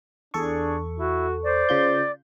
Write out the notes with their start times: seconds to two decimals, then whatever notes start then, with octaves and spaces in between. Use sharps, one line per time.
0.34 E2 D4 G#4 A4 C#6
0.96 E4 F#4
1.43 C5 D5
1.69 C#3 F4 G6